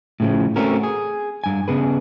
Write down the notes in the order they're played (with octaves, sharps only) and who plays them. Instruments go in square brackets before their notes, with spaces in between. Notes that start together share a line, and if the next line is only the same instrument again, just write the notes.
[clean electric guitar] A2 C#3 F3
A3 C4 C#4 F#4 A#4
G#4
G2 G#5
C#3 B3 G#4 B4